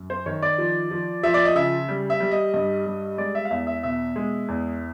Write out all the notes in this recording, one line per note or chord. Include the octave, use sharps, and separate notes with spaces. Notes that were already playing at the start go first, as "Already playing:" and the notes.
Already playing: F#2
C5
D#3 C#5
D5
F3
F3
F3 E5
D5
D#5
C#3 E5
G3
E5
G3
D#5
G2 D#5
G3
G#3 D5
E5
F5
E2 E5
E5
B2 E5
G#3
E2